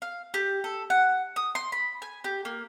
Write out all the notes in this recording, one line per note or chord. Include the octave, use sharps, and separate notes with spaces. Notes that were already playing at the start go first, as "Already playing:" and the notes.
F5
G4
A4
F#5
D#6
C6
B5
G#5
G4
A#3